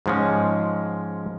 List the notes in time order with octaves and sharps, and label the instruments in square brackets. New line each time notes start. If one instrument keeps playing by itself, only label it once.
[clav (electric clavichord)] G#2 F3 G#3 C#4